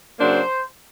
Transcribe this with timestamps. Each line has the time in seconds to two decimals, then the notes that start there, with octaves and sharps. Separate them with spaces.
0.18 C#3 F#3 A#3 D4 C5